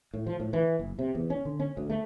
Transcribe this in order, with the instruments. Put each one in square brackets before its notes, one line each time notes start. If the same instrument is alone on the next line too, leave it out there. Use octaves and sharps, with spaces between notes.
[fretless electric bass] A2
F3
A2
E3
F#1
C3
E2
C#4
D3
C#4
D2
A3